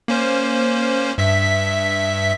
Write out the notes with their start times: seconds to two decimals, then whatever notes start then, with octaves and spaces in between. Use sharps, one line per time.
0.08 A#3 C#4 C5
1.18 G2 E5 B6